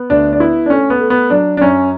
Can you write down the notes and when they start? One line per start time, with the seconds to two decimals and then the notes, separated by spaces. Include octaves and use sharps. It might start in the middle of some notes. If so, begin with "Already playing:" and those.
Already playing: B3
0.10 D2 D4
0.33 D4
0.40 B3 E4
0.66 D4
0.70 A3 C#4
0.90 B3
1.01 A3
1.10 B3
1.30 F#3 D4
1.57 D4
1.61 F#2 C#4